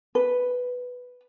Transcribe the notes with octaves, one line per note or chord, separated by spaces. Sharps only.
B4